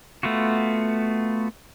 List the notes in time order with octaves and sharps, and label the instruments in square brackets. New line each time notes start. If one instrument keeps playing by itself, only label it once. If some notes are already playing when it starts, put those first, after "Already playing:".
[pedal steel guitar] A3 B3 F4 F#4